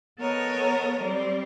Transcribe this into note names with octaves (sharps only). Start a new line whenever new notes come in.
B3 A4 A#4 C#5 D#5
G3 C4